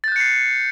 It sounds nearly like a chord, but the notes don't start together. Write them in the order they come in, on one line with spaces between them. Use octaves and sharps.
A6 G6 F#6 C#7 C7